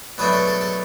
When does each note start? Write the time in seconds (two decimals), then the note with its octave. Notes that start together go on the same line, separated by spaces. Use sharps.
0.18 B2 F#3 A3 D4 B4
0.33 A4
0.47 A4
0.61 A4